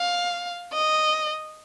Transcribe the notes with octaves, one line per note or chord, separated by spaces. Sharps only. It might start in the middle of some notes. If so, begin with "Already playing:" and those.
Already playing: F5
D#5